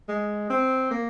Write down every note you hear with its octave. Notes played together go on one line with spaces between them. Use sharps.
G#3
C4
A#3